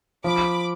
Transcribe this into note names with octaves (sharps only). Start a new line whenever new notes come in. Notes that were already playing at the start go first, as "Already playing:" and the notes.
F3 B5 D6